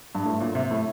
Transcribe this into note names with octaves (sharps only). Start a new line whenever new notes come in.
G2
A2
A#2
C3
A2